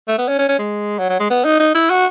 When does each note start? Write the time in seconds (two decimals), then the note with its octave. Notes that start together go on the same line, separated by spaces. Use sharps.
0.08 A3
0.18 B3
0.28 C#4
0.38 C#4
0.49 C#4
0.59 G#3
0.99 F#3
1.09 F#3
1.20 G#3
1.30 B3
1.45 D#4
1.60 D#4
1.75 E4
1.90 F#4